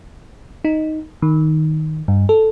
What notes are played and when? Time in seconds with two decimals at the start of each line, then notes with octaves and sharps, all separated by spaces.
0.65 D#4
1.22 D#3
2.08 G2
2.29 A4